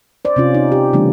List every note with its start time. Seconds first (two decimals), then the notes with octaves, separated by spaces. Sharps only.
0.25 C5 D5
0.36 C3 C#4 F4
0.54 D#4
0.72 G4
0.93 C#3 E3 G3 A3 B3 D4